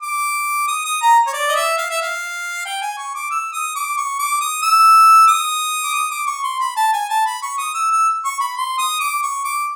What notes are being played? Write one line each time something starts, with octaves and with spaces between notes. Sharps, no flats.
D6
D#6
D#6
A#5
C#5
D5
D#5
E5
F5
E5
F5
G5
G#5
C#6
D6
E6
D#6
D6
C#6
D6
D#6
E6
D#6
D6
D#6
D6
C#6
C6
B5
A5
G#5
A5
B5
C#6
D#6
E6
E6
C#6
B5
C6
D#6
D6
C#6
D6